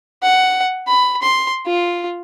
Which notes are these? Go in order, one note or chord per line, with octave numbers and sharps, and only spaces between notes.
F#5
B5
C6
F4